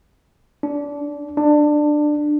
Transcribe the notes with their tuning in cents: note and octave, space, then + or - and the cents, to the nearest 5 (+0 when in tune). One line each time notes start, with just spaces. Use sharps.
D4 -20
D4 +20